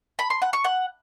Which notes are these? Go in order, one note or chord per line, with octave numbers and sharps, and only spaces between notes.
B5
C6
F#5
C#6
F#5